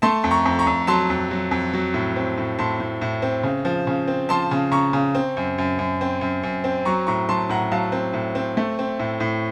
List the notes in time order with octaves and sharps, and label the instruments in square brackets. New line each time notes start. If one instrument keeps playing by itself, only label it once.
[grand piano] A3 A5 C6
F2
A#5 C#6
F2
A#5 C#6
F2
F#3 A5 C6
F2
F#3
F2
F#3
A2
C4
A2
A2 A5 C6
A2
A2
C4
C#3
F3
C#3
C4
F3 A5 C6
C#3
C#3 A#5 C#6
C#3
C4
F#2
F#2
F#2
C4
F#2
F#2
C4
F#3 A#5 C#6
A2 A#5 C#6
F#3 A5 C6
A2 F#5 A#5
F#3 F5 A5
C4
A2
C4
A3
C4
A2
A2